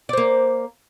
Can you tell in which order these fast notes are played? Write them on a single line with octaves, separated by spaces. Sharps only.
D5 C5 A#3